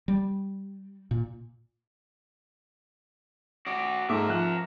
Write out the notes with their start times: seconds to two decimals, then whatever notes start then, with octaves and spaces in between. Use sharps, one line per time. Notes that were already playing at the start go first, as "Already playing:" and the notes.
0.08 G3
1.11 A#2
3.66 F#4 D5
4.09 G#2 A3 A#4 E5 D6
4.28 F3 F#6